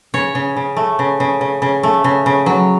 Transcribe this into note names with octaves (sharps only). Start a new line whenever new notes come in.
C#3 C#5
C#3
C#3
A3
C#3
C#3
C#3
C#3
A3
C#3
C#3
F#3